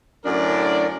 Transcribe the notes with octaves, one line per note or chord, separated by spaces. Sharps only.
F#2 A2 D3 D4 A#4 D5